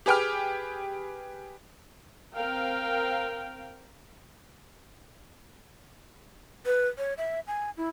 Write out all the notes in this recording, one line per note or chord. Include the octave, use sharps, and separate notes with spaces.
G4 G#4 B4 G5 D6 F6
C4 A#4 F5 G5
B4
C#5
E5
G#5
E4